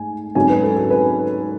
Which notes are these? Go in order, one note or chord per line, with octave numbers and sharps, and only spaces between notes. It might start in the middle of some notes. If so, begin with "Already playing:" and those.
Already playing: G#2 A3 G#5
G#2 F#3 C#4 G#5
B4
A4
A4
B4